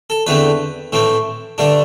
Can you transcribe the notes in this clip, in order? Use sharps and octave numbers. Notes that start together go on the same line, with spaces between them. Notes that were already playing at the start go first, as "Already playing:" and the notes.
A4
E2 D3 A3 C4 B4
A2 E3 A3 C4
G2 D3 A3 D4